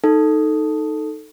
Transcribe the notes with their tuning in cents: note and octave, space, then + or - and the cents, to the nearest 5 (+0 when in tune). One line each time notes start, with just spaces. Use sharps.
D#4 +0 A4 +0